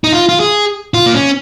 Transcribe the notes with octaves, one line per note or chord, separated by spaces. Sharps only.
D#4
F4
F4
G#4
F4
A#3
C#4